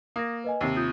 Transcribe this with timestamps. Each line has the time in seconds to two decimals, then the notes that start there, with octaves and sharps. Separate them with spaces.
0.16 A#3 D#6 A#6
0.44 B4 D#5 G#5
0.61 D#2 C3 E6 C7
0.77 F4 D#6 G6